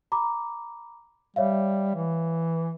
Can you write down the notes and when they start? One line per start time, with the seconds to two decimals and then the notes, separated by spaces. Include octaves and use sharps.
0.12 A#5 B5 D6
1.36 G3 C#5 E5 F5
1.95 E3